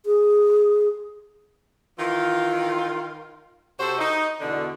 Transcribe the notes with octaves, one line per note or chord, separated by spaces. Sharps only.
G#4
D#3 E3 F4
C3 F#4 A4 C5
D#4
E2 B2 D3